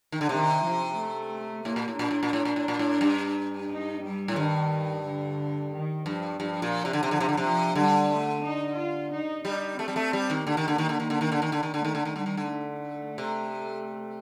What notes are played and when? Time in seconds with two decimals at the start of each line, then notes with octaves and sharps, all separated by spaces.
0.12 D#3
0.21 D3
0.29 C3 D#3
0.64 F3
0.97 A3
1.65 A2 A#3
1.76 A#2
1.88 A2
1.99 A#2 D4
2.11 A2
2.23 A#2
2.33 A2
2.45 A#2
2.56 A2
2.68 A#2
2.79 A2
3.01 G2
3.69 D#4
4.02 G3
4.28 A2
4.36 G2 D#3
5.04 D3
5.73 D#3
6.06 G2 F3
6.40 G2 F3
6.62 A#2
6.85 C3
6.93 D3
7.03 C3
7.07 D3 F3
7.20 C3
7.29 D3
7.37 C3 F3
7.75 D3 G3
8.09 A3
8.43 D#4
8.77 F4
9.12 D#4
9.45 G3 D#4
9.79 A3 C4
9.88 G3
9.96 A3
10.13 G3
10.30 D#3
10.46 D3 A#3
10.57 D#3
10.68 D3
10.78 D#3
10.89 D3
11.00 D#3
11.10 D3
11.21 D#3
11.32 D3
11.42 D#3
11.52 D3
11.63 D#3
11.74 D3
11.83 D#3 A3
11.95 D3
12.05 D#3
12.16 D3 G3
12.26 D#3
12.37 D3
12.50 A3
13.18 C3